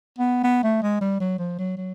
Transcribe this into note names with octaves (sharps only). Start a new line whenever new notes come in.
B3
B3
A3
G#3
G3
F#3
F3
F#3
F#3